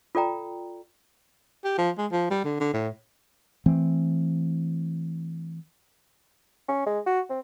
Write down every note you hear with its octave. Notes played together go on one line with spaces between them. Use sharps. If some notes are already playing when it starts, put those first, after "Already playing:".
F4 A4 D5 G5 A#5
G4
F3
G#3
F3
G3
D3
D3
A2
E3 A3 C4
C#4
G#3
F#4
C4